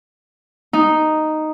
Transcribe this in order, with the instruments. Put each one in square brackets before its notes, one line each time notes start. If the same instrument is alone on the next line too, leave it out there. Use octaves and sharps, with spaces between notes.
[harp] D#4